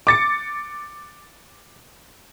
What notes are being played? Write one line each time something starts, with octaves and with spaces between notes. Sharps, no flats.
D6 A6 C#7